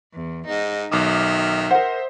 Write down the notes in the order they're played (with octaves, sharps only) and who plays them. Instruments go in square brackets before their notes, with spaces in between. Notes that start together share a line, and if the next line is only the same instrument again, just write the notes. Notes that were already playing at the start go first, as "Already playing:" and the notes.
[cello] E2
[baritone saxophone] G#2 [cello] D#4
[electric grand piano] B1 D6 D#6 [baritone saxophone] D#3 [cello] E5
[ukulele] A#4 F#5 [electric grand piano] C5